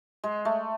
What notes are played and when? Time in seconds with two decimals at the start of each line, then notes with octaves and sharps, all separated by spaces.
0.24 G#3
0.45 A3